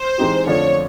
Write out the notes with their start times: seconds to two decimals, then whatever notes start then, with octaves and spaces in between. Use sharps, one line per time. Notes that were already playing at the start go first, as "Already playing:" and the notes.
Already playing: C5
0.18 E3 G#3 C4 D#4 G4
0.46 F2 D3 F3 A3 D4 C#5